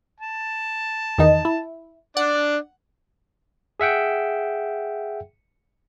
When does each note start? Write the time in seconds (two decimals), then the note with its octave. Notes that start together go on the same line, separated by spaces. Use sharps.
0.21 A5
1.18 E2 D#3 D#4
1.45 E4
2.17 D4 D5 F#5
3.80 G#4 E5 F#5 G5